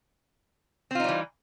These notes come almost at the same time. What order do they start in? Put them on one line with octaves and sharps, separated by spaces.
C4 F4 D#4 G3 E3